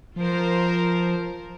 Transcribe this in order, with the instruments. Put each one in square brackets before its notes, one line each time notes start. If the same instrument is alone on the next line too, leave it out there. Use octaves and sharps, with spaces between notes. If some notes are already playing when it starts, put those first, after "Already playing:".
[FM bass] F3 [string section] F4 A#4 C5